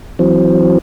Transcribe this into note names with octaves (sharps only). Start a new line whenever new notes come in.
E3 F#3 C4